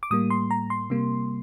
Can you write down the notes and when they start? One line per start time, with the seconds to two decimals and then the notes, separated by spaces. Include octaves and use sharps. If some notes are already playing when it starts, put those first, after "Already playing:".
0.03 D6
0.11 A2 G3 A#3 D#6
0.30 C6
0.51 A#5
0.70 C6
0.90 C3 G3 A#3